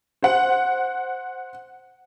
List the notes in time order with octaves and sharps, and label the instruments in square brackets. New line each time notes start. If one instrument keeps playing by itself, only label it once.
[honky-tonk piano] C5 F#5